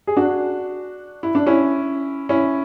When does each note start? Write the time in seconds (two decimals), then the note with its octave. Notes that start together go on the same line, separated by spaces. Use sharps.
0.07 G#4
0.17 D4 F#4
1.23 E4
1.35 D4
1.47 C#4 E4
2.29 C#4 E4